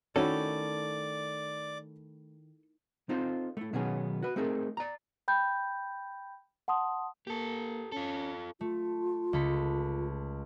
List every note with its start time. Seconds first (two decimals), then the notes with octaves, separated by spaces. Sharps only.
0.16 D#3 A3 C#4 E4 F#4 A4 C#5 D5
3.09 C4 D#4 F4 A4 C5
3.57 A3 E4
3.73 B2 D#3 F#3 B3 C#4 G#4
4.22 F#4 B4
4.36 A3 C4 D#4 G#4 A#4
4.77 D5 A#5
5.28 G5 B5 G6
6.68 F#5 A5 C6 D#6
7.27 A#3 G4 A4
7.92 C#4 F4 A4
8.61 A3 F4
9.33 C#2 A4 B5